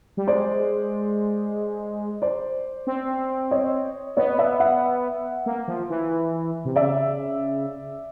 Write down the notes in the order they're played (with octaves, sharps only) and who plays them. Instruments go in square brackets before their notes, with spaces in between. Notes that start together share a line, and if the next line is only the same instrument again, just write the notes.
[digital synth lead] G3
[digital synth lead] G#3 [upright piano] C5 D5
[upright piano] C5 D5
[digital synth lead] C4
[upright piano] C#5 D#5
[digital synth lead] B3 [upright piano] C#5 D#5
[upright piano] D5 E5
E5 F#5
[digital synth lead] A#3
F3
E3
C3
[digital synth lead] C#3 [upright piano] D5 E5